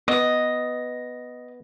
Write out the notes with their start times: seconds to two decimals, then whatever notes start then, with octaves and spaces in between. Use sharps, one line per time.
0.08 B3 D#5